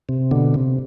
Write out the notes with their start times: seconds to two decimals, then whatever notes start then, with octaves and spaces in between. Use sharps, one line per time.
0.09 C3
0.31 B2 D3
0.54 C3